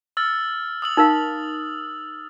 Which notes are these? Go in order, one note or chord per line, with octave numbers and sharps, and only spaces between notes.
E6 F6 A6
D#6 E6 F#7
D#4 A#4 F5